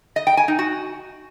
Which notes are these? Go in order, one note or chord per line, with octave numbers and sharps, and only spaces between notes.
D#5
G5
G#5
D#4
F#4